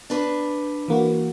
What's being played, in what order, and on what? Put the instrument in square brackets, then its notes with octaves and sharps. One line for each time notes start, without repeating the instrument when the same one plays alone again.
[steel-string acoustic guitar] D4 B4
[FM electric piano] E3 A#3 F#4